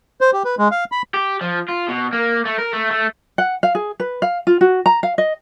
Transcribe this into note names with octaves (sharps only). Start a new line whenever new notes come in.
C5
G4
B4
G#3
F5
B5
G4
F3
F4
B2
A#3
A3
A#4
A3
A3
F#5
F5
G#4
B4
F5
F4
F#4
A#5
F5
D#5